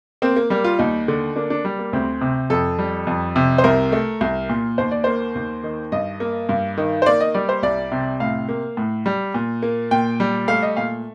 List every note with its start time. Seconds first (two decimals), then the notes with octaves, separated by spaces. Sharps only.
0.22 A#3 C4
0.36 A#3
0.50 G3 A#3
0.64 F4
0.79 D#2 D#4
1.08 D3
1.36 A#3 D4
1.50 D4
1.65 G3
1.79 A#3
1.93 D2 C4
2.21 C3
2.50 F2 A4
2.79 G3
3.07 F2
3.36 C3
3.58 C5
3.64 C2 A#4
3.92 A3
4.21 C2
4.49 A#2
4.78 D#2 C5
4.91 D5
5.04 A#3 C5
5.35 D#2
5.64 D#3
5.92 G2 D#5
6.20 A#3
6.49 G2
6.78 D#3
7.02 C5
7.06 A#3 D5
7.21 D#5
7.34 G3 D5
7.49 C5
7.63 C2 D5
7.92 C3
8.20 A2 F5
8.49 A#3
8.77 A2
9.06 G3
9.34 A#2
9.62 A#3
9.91 A#2 G5
10.20 G3
10.48 A3 F5
10.63 D#5
10.77 A#2 F5